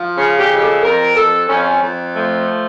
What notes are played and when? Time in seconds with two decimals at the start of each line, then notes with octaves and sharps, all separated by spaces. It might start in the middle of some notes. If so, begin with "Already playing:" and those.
Already playing: F3
0.16 C#3 C#4
0.38 G4
0.49 F2
0.56 G4
0.60 A4
0.82 F2 A#4
1.15 F2 A4
1.48 F2 C#4
1.81 F2
2.14 F3 A3